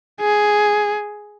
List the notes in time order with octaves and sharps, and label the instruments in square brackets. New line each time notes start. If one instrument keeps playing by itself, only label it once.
[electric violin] G#4